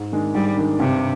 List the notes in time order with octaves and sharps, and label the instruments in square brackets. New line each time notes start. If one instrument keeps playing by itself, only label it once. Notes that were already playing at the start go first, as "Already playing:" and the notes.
Already playing: [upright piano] G#2
D#3 G#3 D4
[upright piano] G#2 [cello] G3
[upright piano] D#3 G#3 D4
[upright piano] G2 [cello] C3